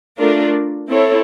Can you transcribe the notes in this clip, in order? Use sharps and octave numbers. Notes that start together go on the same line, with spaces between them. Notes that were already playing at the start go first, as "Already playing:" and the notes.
A3 D4 F4 A#4
C4 E4 A4 C#5